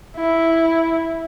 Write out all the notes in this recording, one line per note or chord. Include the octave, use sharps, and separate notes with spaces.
E4